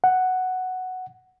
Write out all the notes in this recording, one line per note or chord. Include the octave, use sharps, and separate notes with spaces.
F#5